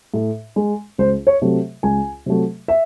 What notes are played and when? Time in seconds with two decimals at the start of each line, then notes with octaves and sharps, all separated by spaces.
0.14 A2
0.56 G#3
0.98 C#2 C5
1.27 C#5
1.42 C3 F#3 A3
1.83 C#2 G#5
2.26 C3 F#3 A3
2.68 E5